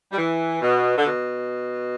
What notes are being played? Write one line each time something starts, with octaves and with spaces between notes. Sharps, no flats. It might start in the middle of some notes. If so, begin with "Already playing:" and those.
G3
E3
B2
D3
B2